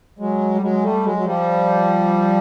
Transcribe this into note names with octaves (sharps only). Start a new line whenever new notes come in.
F#3 G#3
G3
F#3 G#3
G3 A3
F#3 G#3
F#3
F3 G3